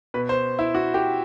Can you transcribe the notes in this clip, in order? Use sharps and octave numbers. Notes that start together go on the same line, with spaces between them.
B2 B4
C5
E4
F#4
G4